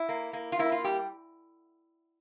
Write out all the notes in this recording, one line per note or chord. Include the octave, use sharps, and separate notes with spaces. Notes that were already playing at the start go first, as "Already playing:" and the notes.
Already playing: E4
A#3
A#3
F4
A#3 E4
F4
G3 G4